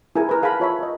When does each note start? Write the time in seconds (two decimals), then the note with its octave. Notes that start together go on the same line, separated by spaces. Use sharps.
0.15 E4 G#4 A#4 G#5
0.29 A#4 B4
0.42 G#4 F5 G#5 A5 B5
0.60 F4 C#5 E5 B5
0.79 A#4 D#5